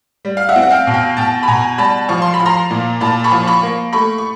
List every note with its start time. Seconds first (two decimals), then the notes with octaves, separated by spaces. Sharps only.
0.25 G3
0.37 F5
0.49 E5 F#5
0.56 C4
0.63 F#5
0.71 F5 G5
0.87 B2
0.94 F5 G5
1.17 B2 G5 A5
1.43 B5
1.48 B2 G#5 A#5
1.78 G3 A5 B5
2.09 F3 C#6
2.22 C6
2.34 B5
2.40 F3
2.45 A#5 C6
2.71 A#2
3.01 A#2 A5 B5
3.24 B5 C#6
3.31 F3
3.47 B5 C#6
3.63 A#3
3.93 A3 B5 C#6
4.18 C#6